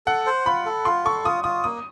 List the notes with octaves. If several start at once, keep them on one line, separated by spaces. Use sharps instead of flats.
A4 F#5
C5
F4 B5
A4
F4 C6
A4 C#6
F4 D#6
F4 D#6
A#3 D#6